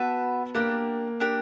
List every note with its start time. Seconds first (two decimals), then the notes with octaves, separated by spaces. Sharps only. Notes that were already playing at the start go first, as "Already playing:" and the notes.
Already playing: B3 F#4 B4 E5 A5
0.55 A#3 D4 G4 A#4
1.20 D4 G4 A#4